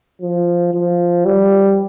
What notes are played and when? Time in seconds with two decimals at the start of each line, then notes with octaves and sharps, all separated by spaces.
0.22 F3
0.74 F3
1.25 G3